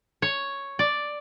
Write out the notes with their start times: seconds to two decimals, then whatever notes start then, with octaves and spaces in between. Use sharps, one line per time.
0.22 C#5
0.79 D5